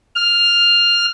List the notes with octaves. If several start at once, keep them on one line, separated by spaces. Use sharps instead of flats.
F6